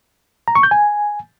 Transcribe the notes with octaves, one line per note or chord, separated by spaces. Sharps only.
A#5
C#6
G6
G#5